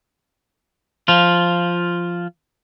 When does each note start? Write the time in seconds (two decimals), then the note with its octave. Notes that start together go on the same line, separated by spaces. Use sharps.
1.08 F3 F4